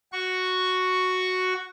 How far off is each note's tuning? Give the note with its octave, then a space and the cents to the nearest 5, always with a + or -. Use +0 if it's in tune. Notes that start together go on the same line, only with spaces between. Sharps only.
F#4 +0 C#6 +0